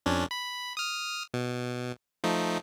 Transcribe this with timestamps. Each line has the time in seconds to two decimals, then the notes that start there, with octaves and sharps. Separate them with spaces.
0.06 F2 C#4 D4
0.31 B5
0.77 D#6 F6
1.34 B2
2.24 F3 A3 D#4